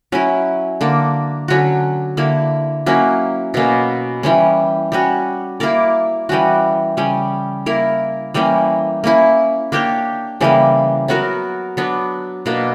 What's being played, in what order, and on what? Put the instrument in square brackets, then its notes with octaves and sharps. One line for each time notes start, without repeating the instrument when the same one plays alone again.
[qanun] F#3 C#4 E4
D3 A#3 D4
D3 F#3 C#4 F#4
D3 A#3 E4
F#3 A#3 C#4 E4
B2 A#3 C#4
E3 G3 C#4
G3 C#4 F#4
A#3 E4 A#4 D5
E3 G3 C#4 F#4
C#3 G3 C#4
A#3 E4 A#4
E3 G3 A#3 C#4
A#3 C#4 E4
A#3 D4 G4 C#5
C#3 E3 G3 A#3
F#3 B3 F#4 A#4
F#3 B3 D4
B2 A#3 D4